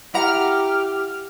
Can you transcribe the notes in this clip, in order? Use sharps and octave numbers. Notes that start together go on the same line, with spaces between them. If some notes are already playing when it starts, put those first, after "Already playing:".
E4 G4 F#5 A#5 F6